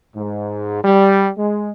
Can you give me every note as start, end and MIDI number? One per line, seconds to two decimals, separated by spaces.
0.14 0.81 44
0.83 1.28 55
1.36 1.71 56